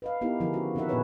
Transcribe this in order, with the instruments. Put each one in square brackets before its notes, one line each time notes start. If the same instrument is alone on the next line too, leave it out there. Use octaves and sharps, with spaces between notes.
[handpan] B4 D#5 F5
B3 D#4 E4 G4 A#4
D3 F3 E4 G#4 A#4
D#3 C#4 F4 F#4
D#3 C4 D#4 A#4 E5 F#5
A#2 B3 D4 G#4 B4 C#5